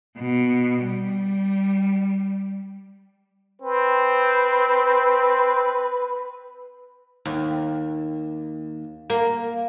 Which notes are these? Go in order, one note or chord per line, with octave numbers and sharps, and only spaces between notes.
B2
G3
C4 B4
D#2
A#3